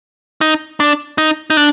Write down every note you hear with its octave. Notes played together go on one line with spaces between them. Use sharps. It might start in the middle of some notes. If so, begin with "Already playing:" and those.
D#4
D4
D#4
D#4
D4